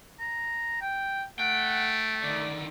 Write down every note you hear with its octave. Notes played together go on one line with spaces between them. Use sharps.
A#5
G5
A3 F#5 G5
D3 D#3 D5